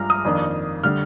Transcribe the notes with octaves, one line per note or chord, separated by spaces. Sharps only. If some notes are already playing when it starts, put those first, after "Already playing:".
Already playing: G2 F3 G#3 D4 A#5 F6
D#6
F2 D#3 A#3 D4
D3 G3 F6